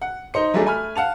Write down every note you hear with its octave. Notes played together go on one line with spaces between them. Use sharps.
F#5
D#4 C5 C#7
F#3 G3 A3 D4 G#4
A3 G#5 B5 F6
F5 F#5 A5 F7